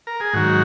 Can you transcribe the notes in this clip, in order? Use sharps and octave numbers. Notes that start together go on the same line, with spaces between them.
A#4
G#4
G#2 D#3 F#3 F#4